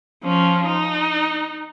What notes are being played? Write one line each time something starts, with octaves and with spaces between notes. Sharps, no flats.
F3 C#4
D#4